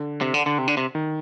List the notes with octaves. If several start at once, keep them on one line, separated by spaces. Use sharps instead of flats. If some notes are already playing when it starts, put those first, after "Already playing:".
Already playing: D3
C3
D3
D3
C3
D3
C3
D#3